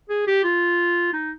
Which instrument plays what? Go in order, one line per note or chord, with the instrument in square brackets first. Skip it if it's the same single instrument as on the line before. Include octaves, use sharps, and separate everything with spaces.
[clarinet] G#4
G4
F4
D#4